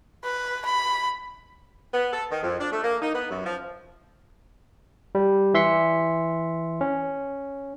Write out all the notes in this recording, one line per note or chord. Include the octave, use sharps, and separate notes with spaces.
B4
B5
B3
A4
D#3
F2
D4
A3
A#3
D#4
B3
F#2
F3
G3
E3 E5 C6 B6 C#7
C#4